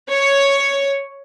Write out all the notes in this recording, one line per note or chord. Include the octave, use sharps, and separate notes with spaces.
C#5